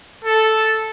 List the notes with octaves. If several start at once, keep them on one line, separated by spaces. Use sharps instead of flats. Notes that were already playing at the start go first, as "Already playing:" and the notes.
A4